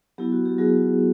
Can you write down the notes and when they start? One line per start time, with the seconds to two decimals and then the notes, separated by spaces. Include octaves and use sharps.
0.18 F#3 B3 E4 G4
0.32 F#4
0.46 G4
0.58 F#3 B3 E4 F#4 G#4